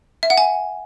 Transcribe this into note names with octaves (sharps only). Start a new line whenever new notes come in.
E5
F#5
G#5